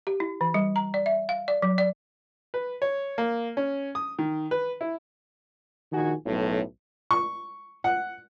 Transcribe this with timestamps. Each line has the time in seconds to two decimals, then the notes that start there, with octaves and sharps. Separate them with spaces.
0.07 G4
0.20 E4
0.41 E3
0.54 G3
0.76 A#5
0.94 D5
1.06 E5
1.29 F5
1.48 D5
1.62 F#3
1.78 D5
2.54 B4
2.82 C#5
3.18 A#3
3.57 C#4
3.95 D#6
4.19 D#3
4.51 B4
4.81 E4
5.92 A#1 D#3 F#4 G#5
6.25 B1 A2
7.11 C#6
7.84 F#5